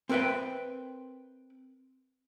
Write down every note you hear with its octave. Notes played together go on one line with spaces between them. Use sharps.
C4 A#4 B4 E5 G5